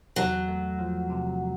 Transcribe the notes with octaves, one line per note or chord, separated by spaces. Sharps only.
E2 F#3
A3
F3
C3